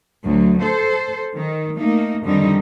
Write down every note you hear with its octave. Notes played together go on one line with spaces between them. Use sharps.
D2 F#3
A4 C5
D#3
A3 A#3 D#4
F2 D3 D#3 G3 D#4